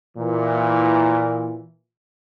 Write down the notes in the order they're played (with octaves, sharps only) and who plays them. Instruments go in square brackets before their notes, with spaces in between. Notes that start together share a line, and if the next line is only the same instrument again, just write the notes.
[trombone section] A#2 E3